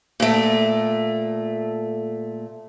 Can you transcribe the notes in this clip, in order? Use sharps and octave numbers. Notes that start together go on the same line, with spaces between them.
A#2 A3